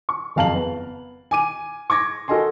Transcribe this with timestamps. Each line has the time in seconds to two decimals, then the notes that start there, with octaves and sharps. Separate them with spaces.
0.09 C#6
0.36 F#1 F2 F5 A5 A#5 F#7
0.54 B3
1.31 G#5 D6 D#7
1.90 C#6 D6 G#6 A#6
2.28 F#4 A4 A#4 D#5 G#5 C6